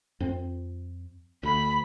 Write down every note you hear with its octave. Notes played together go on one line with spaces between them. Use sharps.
F2 C4
D2 B5